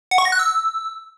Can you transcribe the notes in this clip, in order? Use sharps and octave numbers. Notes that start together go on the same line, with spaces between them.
F#5
C#6
A#6
F#6
E6